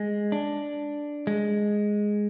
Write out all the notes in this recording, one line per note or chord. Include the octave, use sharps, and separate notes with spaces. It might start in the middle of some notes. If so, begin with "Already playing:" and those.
Already playing: G#3
D4
G#3